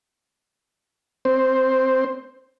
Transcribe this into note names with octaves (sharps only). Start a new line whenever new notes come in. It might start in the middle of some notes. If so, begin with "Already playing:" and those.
C4 C5